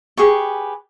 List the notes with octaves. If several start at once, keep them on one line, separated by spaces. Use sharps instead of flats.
G4 G#4 B4 C#6